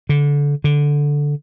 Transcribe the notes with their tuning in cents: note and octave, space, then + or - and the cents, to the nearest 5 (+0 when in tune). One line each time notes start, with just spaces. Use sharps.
D3 -25
D3 -5